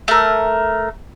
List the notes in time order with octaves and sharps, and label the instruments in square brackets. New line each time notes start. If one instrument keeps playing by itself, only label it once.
[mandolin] A3 A#4